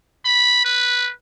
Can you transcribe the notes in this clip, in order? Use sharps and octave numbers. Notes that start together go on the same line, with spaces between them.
B5
B4